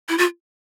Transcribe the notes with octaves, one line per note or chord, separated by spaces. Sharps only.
E4
F4